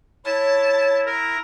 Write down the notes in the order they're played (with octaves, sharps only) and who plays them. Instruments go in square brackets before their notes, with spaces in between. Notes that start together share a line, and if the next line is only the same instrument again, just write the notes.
[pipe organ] E4 [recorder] C#5 [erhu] A5
[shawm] A#4